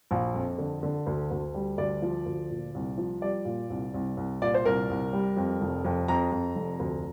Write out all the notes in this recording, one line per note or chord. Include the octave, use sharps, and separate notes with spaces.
A#1
F2
D3
D3
D2
D2
G3
D2 D5
F3
D2
A#2
C2
F3
G3 D5
A#2
C2
C2
C2
A#2 D5
C5
C2 A#4
C2
G3
F2
F1
F2
F2 A#5
F2
F1
D2